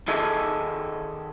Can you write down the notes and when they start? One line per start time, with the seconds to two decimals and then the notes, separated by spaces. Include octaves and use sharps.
0.08 D#3 G#4 A4 D#5 E5